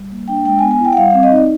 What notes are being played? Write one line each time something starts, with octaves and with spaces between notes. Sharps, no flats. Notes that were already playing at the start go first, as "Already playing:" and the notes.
Already playing: G3
A#3
D4 G5
G#3 G5
G#5
B3
G#5
E4
G5
F#5
G3 F5
C4 F5
D#5
D#4 D5